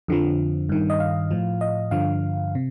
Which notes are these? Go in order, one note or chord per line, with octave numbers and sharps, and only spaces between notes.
F2 D3 F3
G2 D#3
D#5
F5
A2 F3
D#5
G2 D3 F3 F5
C3